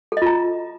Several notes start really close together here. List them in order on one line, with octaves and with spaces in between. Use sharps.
A4 D#5 F4 A#5